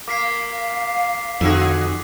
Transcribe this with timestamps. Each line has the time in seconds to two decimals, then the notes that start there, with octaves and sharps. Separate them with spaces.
0.08 A#3 F5 D6 B6 C7
1.41 F2 D3 F#4 G#4